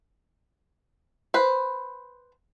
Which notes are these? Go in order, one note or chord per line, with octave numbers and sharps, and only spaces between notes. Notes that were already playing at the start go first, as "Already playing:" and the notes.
B4 C5